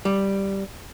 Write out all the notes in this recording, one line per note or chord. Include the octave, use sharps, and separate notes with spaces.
G3